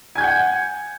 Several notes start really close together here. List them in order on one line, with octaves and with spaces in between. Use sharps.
G#5 G#6 G6 F#5